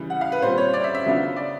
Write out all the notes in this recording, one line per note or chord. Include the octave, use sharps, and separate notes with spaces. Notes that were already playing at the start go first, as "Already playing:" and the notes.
Already playing: C#3 E3 G3
F#5
F5
B4
A#2 G3 C4 C5
C#5
D5
E5
E5
C#3 F#3 B3 D4 F4
D5